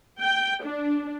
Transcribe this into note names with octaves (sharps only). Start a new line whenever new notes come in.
G5
D4